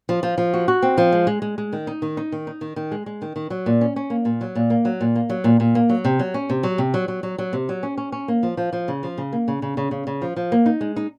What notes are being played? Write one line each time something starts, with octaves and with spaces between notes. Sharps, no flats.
F3
F3
F3
F#4
F#4
C4
F3
G#3
G#3
G#3
G#3
D#3
D#4
D#3
D#4
D#3
D#4
D#3
D#3
G#3
G#3
D#3
D#3
F#3
A#2
C#4
C#4
A#3
A#2
F#3
A#2
A#3
F#3
A#2
A#3
F#3
A#2
A#2
A#3
F#3
C3
F#3
C#4
C3
F#3
C3
F#3
F#3
F#3
F#3
C3
F#3
C#4
C#4
C#4
A#3
F3
F3
F3
C#3
F3
C#3
A#3
C#3
C#3
C#3
C#3
C#3
F3
F3
A#3
D#4
G#3
D#4